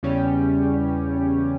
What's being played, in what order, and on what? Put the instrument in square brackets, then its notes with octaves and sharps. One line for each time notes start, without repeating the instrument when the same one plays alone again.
[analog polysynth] E2 C#3 G3 C#4 G4